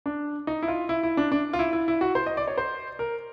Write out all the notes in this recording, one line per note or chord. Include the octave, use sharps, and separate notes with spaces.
D4
D#4
E4
F4
E4
E4
D4
D4
F4
E4
E4
E4
F#4
C5
D#5
D5
C#5
C5
A#4